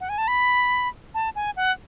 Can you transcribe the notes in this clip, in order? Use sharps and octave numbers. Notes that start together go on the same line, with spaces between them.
F#5
G#5
A5
B5
A5
G#5
F#5